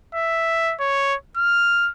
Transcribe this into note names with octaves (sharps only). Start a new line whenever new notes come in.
E5
C#5
F6